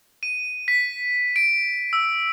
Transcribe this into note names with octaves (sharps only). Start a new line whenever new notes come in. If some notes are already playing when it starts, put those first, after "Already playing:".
D#7
B6
D7
E6